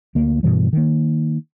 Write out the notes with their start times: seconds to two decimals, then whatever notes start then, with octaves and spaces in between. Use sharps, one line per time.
0.15 D2 A#3
0.43 G2 B2 E3 G3
0.73 D#3 A#3